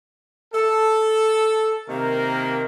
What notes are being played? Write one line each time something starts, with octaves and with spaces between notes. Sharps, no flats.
A4
C3 D#3 A#3 A#4